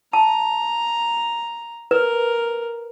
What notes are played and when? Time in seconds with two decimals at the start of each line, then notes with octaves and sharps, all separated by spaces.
0.13 A5 A#5
1.91 A#4 B4